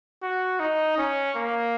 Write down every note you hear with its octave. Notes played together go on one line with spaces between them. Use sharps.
F#4
D#4
C#4
A#3